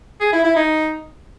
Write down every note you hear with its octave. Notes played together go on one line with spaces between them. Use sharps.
G#4
E4
E4
D#4